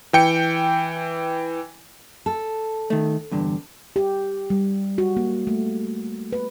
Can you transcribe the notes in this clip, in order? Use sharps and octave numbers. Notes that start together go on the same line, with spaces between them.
E3 G5 C#7
A4
D#3 A3
E2 G2 D3
G4
G3
F#4
A#3
A3
B4